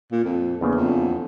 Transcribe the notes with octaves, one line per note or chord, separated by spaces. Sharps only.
A#2
F2
E2 C#3 A#3 B3 D4
F2